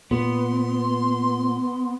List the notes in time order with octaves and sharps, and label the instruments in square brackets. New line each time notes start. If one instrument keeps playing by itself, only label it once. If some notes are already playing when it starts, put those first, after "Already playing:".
[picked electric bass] A#2 [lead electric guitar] B3 [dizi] C6